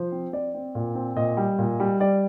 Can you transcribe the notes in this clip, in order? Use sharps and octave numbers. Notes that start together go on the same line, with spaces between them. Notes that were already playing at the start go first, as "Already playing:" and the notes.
Already playing: F3 C5
C4
C4 D5
C4
A#2
C4
A#2 D#5
G3
A#2
G3
G3 D5